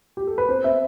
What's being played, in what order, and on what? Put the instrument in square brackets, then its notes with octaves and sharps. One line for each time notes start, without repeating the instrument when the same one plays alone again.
[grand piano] G4
A4
B4
C4 C5
C4 E5